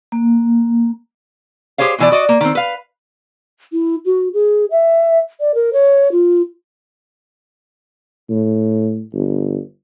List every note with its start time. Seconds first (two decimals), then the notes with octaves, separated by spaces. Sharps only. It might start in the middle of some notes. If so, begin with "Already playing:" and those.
0.12 A#3
1.78 G4 G#4 C5 C#5 F5
1.98 B2 E3 D5
2.12 F#4 D5 D#5
2.29 A#3
2.41 D#3 C4
2.55 B4 F5
3.73 E4
4.05 F#4
4.34 G#4
4.71 E5
5.40 D5
5.55 A#4
5.73 C#5
6.12 F4
8.30 A2
9.13 G1